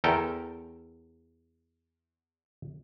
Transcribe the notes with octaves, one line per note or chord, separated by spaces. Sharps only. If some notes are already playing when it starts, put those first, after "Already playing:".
E2 A4 A#4 G5